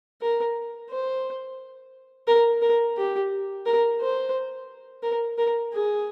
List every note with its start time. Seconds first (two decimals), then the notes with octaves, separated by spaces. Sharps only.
0.21 A#4
0.90 C5
2.27 A#4
2.62 A#4
2.97 G4
3.66 A#4
4.01 C5
5.03 A#4
5.38 A#4
5.73 G#4